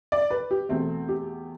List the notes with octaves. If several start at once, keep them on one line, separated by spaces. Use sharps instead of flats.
D5
B4
G4
E2 B2 A3 C4
G4